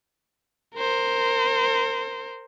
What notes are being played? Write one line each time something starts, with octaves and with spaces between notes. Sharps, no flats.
A#4 C5